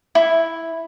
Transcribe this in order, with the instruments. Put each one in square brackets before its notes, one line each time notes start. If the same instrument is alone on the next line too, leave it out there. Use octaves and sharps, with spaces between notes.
[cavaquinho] E4